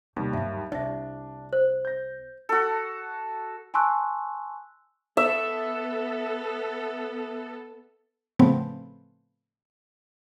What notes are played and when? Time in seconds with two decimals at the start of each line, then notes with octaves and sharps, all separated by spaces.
0.16 D#2 C3 G3
0.33 G2 F#3 E5
0.72 C2 D4 D#5 E5
1.53 C5
1.85 G6 A#6
2.49 F#4 A4
3.74 G#5 A5 C6 C#6 E6 F#6
5.17 B3 A4 E5
8.39 A2 C#3 F3 A3 B3 C4